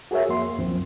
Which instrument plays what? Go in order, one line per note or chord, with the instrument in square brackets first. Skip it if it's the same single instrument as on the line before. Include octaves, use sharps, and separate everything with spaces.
[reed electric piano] F#4 G#4 A#4 C#5 E5
F2 A#3 C6
C#2 F#2 F3 C4